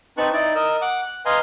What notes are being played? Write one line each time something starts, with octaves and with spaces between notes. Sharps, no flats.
C4 D#4 B4 A5 C#6 F#6
D#4 E4 D5
A#4 D#5 E6
F#5 D6
F#6
B4 D#5 F5 G#5 A#5 C6